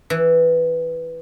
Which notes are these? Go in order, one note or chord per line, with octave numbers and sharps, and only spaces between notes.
E3